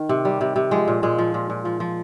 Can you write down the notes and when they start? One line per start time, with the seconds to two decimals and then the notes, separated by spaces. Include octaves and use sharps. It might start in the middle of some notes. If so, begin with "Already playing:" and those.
Already playing: D#3
0.09 C3
0.25 G3
0.41 C3
0.56 C3
0.71 F3 G#3
0.88 A#2
1.03 A#2 G#3
1.18 F3
1.34 A#2
1.50 A#2
1.65 F3
1.80 F3